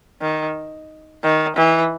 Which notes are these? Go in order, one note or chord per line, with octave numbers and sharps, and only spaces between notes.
D#3
D#3
E3